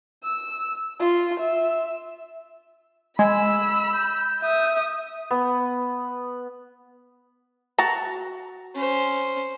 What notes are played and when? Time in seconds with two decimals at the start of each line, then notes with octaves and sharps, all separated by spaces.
0.23 E6
1.00 F4
1.39 E5
3.19 G#3 B5 E6
3.94 G6
4.43 E5 D#6
5.31 B3
7.78 F#4 A5 A#5
8.75 C#4 C5